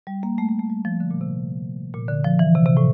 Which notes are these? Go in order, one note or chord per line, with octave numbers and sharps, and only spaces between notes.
G3
A#3
A3
A3
A3
G3
F3
D3
A#2
C3
A#2
D3
F3
E3
C3
C3
A2